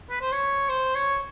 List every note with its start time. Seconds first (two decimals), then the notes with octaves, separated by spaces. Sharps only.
0.10 B4
0.21 C5
0.32 C#5
0.69 C5
0.95 C#5